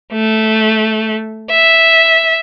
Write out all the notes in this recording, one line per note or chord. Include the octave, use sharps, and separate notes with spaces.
A3
E5